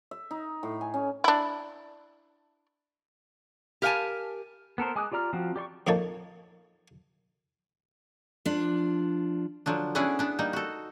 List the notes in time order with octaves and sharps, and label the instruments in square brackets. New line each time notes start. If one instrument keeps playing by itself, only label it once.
[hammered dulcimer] E5
D#4
A2
G#5
C#4
[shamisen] D4 E4
[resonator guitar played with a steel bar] G4 A#4 F5 F#5 G#5 A5
[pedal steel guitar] B3 A4 A#4 C5
G#3 G#5 D6 D#6 F#6
F4 G4 D5 A#5 F6
F3 C4 F#4
G4 D5 C6 C#6
[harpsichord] F2 A#2 A#3 D#4 C#5 A5
[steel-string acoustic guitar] F3 D4
[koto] D3 F3 F#3 D4
B3 C#4 D4 E4 G#4 D5
B3 D4
G3 A#3 D#4
F#4 A4